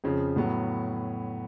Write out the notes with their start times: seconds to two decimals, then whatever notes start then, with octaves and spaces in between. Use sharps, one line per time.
0.04 F2 C#3 F3
0.36 A2 F#3 B3